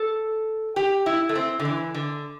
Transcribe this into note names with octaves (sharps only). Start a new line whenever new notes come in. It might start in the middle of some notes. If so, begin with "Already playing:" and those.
Already playing: A4
G4
E4
A3
C4
D3
E3
D3